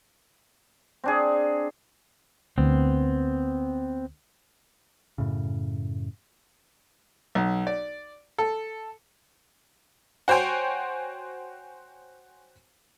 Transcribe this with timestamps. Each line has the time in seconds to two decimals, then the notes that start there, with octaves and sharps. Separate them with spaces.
1.04 C4 D4 G#4
2.58 D2 B3 C4
5.18 F#2 A2 C#3
7.35 B1
7.67 D5
8.38 A4
10.28 F#4 C5 C#5 G5 G#5